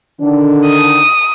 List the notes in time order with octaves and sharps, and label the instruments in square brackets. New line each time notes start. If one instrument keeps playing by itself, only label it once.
[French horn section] D3 D#3 D4
[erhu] D#6